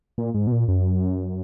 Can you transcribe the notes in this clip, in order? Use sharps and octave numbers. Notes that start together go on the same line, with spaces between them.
A#2
G#2
B2
A#2
F#2